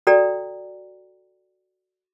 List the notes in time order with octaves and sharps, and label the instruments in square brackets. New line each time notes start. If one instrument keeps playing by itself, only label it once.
[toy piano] F#4 A4 D5 G5 A#5